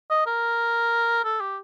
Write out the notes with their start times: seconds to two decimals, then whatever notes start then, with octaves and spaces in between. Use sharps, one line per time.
0.10 D#5
0.27 A#4
1.24 A4
1.40 G4